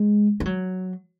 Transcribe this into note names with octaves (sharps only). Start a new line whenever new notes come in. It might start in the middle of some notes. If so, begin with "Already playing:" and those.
Already playing: G#3
G#3
F#3